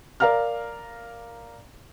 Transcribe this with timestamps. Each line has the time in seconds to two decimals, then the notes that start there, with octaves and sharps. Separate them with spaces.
0.20 A#4 D5 F5 A#5 F6